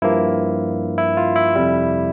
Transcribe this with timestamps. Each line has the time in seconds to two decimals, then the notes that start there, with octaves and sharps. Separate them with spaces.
0.02 G2 F3 A#3 E4
0.98 E4
1.17 F4
1.36 E4
1.55 F2 C3 G3